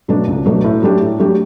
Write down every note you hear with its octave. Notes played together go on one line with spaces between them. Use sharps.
B2 F#3 A3 D4
C#2
B2 F#3 A3 D4
A2
F#3 A3 D4 G4
A2
F#3 A3 D4 G4